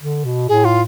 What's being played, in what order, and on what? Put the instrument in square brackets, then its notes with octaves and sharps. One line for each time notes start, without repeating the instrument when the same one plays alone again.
[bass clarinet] D3
B2
[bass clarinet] A2 [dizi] G#4
[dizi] F4